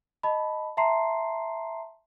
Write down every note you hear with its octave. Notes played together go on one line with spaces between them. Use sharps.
D#5 A5 B5
E5 A5 A#5 C6 C7